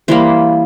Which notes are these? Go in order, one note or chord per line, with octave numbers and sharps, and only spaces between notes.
E3 G3 A#3 C5